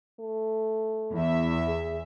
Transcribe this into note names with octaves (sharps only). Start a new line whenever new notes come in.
A3
E2 E5
G#4